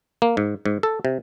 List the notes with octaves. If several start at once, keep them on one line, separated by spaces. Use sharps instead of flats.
A#3
G#2
G#2
A4
C3